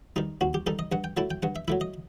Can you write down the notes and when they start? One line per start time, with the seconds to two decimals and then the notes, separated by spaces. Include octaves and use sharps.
0.16 D#3 G3 D#4
0.41 D#2 F#4
0.54 G4
0.67 D#3 G3 D#4 A4
0.79 D#5
0.92 G2 F#5
1.04 G5
1.17 F#3 A3 E4 A5
1.31 G5
1.43 G2 F#5
1.56 E5
1.68 F#3 A3 E4 E5
1.81 D#5